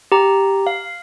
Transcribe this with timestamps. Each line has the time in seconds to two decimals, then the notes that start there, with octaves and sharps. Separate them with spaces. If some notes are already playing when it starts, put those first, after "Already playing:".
0.12 G4 A#5
0.67 F5